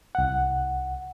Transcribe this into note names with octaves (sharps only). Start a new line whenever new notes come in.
C2 F#5